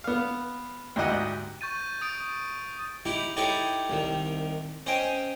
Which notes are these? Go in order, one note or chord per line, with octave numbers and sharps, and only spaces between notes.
B3 F5
D2 G#2 E4 G4 D#5 F#5
C#6 G6 A6 D#7
D#6 A6 D7
D#4 E4 G4
D#4 E4 G4 A4 C#5 D#5
C2 D#3
C#4 C5 D#5 G5 G#5